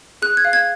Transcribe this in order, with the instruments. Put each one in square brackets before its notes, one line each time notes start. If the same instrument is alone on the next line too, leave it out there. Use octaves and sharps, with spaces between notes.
[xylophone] G#4 F#6
G#6
F5
G#6